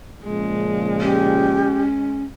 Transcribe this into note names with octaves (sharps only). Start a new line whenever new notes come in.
A#2 C#3 F3 G#3
C#4 G4